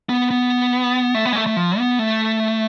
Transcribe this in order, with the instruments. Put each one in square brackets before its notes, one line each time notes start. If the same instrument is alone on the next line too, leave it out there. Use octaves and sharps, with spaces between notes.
[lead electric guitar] B3
B3
A3
B3
G#3
A3
A3
F3
B3
A3